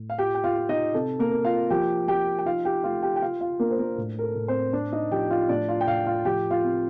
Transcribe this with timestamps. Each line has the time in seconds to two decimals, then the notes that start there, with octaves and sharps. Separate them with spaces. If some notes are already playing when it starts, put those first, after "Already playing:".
Already playing: A2
0.10 F5
0.18 F4 G4 G5
0.35 G5
0.44 F4 F5
0.56 F4
0.69 D#4 D#5
0.94 C3 A4
1.19 A#3 A#4
1.32 A#3
1.44 F4 F5
1.70 F3 G4 G5
2.08 F3 G4 G5
2.39 G5
2.45 D#4 F4 F5
2.65 G4 G5
2.84 A3 F4 F5
3.03 G4 G5
3.16 G5
3.22 F4 F5
3.41 F4 F5
3.59 A#3 D4 A#4
3.71 C5
3.79 A#3 A#4
3.97 A2
4.19 A#4
4.23 A4
4.35 A2
4.48 C4 C5
4.73 C4 D4 D5
4.92 D#4 D#5
5.11 F3 G4 G5
5.30 F4 F5
5.49 A2 D4 D5
5.69 F4 F5
5.81 G5
5.87 A2 F4 F5
6.07 F4 F5
6.25 F3 G4 G5
6.51 F4 F5
6.63 C4